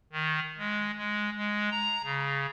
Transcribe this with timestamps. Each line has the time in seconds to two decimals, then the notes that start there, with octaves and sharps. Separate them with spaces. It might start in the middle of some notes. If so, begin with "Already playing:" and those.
0.12 D#3
0.58 G#3
0.97 G#3
1.37 G#3
1.71 A#5
2.04 C#3